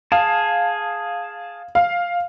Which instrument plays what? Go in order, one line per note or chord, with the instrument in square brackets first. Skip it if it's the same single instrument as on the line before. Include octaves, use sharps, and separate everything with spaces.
[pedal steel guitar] G#4 A5 [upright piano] F5
[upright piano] F5